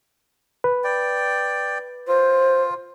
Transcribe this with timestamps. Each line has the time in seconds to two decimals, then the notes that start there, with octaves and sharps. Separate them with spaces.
0.64 B4
0.84 D5 G5
2.08 F4 C5